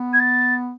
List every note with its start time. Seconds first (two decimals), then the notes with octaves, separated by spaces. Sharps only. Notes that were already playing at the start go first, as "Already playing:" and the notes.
Already playing: B3
0.13 G#6
0.19 A6